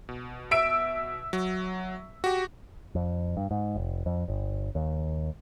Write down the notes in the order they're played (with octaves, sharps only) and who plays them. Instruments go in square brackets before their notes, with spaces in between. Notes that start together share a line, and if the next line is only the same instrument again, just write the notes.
[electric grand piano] B2
[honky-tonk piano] E5 E6 D7
[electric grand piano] F#3
F#4 G4
[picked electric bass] F2
G2
G#2
F1
F2
G1
D#2